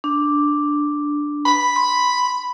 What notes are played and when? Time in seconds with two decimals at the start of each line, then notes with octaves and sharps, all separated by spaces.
0.04 D4
1.46 B5
1.76 C6